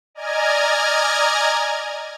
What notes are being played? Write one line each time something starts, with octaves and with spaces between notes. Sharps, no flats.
D5 D#5 G#5 A#5 F6 G#6